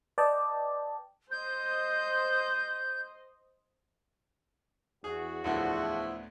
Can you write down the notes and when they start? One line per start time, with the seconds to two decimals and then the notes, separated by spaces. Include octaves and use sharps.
0.18 B4 D5 D#5 G5 A5
1.31 C5 D#5 G6
5.04 E2 F#4 G#4
5.44 D2 A2 D3 F3 B3 E4